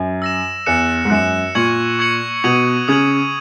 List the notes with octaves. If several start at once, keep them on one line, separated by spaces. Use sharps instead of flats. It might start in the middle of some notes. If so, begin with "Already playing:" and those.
Already playing: F#2
E6 A#6 E7
E2 F#6 C#7 E7
G#2
F#2 F#6 C#7 E7
A#2 C#6 G#6 C#7 F#7
C#6 G#6 C#7 F#7
B2 D#6 G#6 D#7 F#7
C#3 D#6 G#6 D#7 F#7